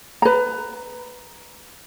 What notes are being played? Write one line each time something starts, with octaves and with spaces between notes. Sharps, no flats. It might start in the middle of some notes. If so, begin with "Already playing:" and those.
B4 A#5